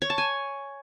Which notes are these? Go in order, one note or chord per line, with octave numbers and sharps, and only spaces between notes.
C#5
A5
G#5